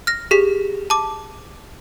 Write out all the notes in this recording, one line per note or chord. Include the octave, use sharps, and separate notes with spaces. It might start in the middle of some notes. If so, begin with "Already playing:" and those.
F6 A#6
G4 G#4 B6
A5 D6